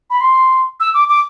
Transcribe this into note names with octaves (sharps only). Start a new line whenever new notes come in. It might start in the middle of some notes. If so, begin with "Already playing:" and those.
B5
C6
E6
D6
D6